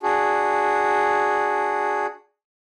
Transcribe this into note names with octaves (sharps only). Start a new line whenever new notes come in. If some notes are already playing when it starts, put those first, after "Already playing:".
D4 F#4 G#4